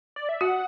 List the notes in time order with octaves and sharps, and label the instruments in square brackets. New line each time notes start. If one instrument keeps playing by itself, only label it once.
[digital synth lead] D5
E5
[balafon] F#4 [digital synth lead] F#5